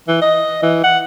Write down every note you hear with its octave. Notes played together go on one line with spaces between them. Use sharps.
E3
D#5
E3
F#5